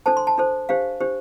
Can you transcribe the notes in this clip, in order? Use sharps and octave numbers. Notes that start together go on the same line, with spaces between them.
D4 A4 C5 A5
C6
A5
D4 A4 C5
D4 G4 C5 F5
D4 G4 C5